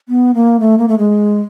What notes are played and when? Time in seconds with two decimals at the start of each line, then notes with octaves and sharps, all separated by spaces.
0.09 B3
0.34 A#3
0.60 A3
0.78 A#3
0.88 A3
0.98 G#3